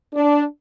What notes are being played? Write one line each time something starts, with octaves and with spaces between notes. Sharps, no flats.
D4